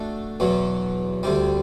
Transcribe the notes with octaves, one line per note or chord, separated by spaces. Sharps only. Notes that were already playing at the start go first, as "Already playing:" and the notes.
Already playing: A3 D4 F#4 A4
E2 B2 F#3
D2 C3 G3